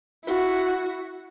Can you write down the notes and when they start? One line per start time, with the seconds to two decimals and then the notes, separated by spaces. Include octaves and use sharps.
0.25 E4 F#4